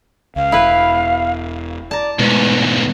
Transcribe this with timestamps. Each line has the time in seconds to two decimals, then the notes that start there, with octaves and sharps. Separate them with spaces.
0.36 C#2 F5
0.52 E1 E4 B4
1.91 D5 A5 A#5
2.19 E2 G#2 B2 G#3 A3 B4